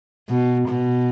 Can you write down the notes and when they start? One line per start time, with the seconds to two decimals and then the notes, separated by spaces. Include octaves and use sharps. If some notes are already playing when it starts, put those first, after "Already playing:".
0.30 B2
0.68 B2